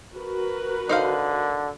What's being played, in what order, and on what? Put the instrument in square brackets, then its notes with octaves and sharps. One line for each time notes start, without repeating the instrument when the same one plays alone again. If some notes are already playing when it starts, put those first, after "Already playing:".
[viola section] F#4 A#4 B4
[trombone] D3 [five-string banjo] D#4 C5 F5